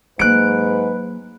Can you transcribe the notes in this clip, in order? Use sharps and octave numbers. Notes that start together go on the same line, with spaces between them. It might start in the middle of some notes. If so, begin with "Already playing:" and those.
G#2 F#3 A#3 B4 F#6 D7